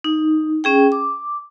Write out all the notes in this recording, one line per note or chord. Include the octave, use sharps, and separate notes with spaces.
D#4
C#4 G#4 G5
D6